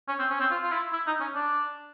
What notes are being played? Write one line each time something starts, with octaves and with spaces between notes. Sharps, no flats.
C#4
C4
C#4
C4
F4
F4
E4
E4
D#4
C#4
D4